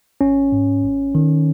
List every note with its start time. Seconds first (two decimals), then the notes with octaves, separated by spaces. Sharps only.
0.21 G#1 C#4
0.52 G#2
0.83 G#1
1.15 D#3